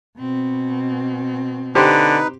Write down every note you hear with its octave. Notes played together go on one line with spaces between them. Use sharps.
B2 C4
D3 D#4 G4 B4 C5 C6